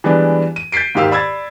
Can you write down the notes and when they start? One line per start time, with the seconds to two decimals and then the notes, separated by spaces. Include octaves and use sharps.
0.04 E3 G3 G#3 B3 D4
0.56 D#7
0.72 G6 A6 B6 C7 D7
0.95 D#2 G#2 D#3 G4 F5 E6
1.11 D5 B5 E6 G#6 A6